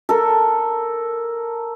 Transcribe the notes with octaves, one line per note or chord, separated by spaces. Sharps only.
A4 A#4